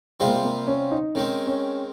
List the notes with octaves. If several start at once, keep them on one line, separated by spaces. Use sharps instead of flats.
C3 G3 G#3 C4 F4 C5
A#3
G#3
A#3
C#4
D#4
D#3 G#3 C4 C#4
C#4